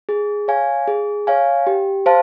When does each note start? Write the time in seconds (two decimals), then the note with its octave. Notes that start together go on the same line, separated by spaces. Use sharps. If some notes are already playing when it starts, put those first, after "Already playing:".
0.09 G#4
0.48 C#5 F5 G#5
0.88 G#4
1.27 C#5 F5 G#5
1.67 G4
2.06 C5 F5 A5